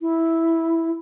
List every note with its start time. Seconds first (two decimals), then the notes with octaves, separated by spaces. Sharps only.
0.01 E4